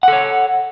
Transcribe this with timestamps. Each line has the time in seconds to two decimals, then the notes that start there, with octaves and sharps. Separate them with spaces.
0.03 F#5
0.08 A4
0.13 C#5